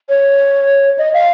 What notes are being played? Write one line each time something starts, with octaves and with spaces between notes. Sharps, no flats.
C#5
D#5
F5